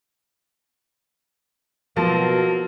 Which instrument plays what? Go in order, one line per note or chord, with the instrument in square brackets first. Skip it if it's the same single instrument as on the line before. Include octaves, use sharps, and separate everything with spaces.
[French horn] B2 [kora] F3 [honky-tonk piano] F#3 A5 A6 [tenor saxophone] A#3